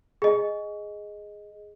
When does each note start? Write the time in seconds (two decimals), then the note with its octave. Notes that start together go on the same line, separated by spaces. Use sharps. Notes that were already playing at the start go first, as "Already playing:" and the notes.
0.22 G#4 D#5